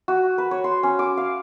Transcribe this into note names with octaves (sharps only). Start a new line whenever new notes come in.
F#4
B4
C#5
C6
C#4
D6
F5